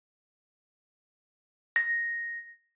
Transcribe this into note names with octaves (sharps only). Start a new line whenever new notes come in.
A#6